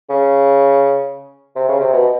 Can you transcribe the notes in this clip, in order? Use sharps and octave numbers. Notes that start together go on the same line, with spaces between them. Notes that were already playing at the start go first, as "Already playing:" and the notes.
C#3
C3
C#3
C3
B2